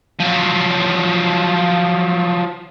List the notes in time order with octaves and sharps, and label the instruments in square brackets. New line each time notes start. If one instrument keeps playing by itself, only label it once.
[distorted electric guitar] F3 F#3